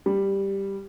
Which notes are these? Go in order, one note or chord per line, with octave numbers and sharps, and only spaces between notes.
G3